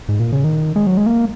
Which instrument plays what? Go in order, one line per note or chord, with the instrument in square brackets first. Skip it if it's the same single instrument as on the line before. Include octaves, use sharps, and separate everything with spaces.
[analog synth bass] G#2
A#2
C#3
D#3
G#3
F#3
G#3
A#3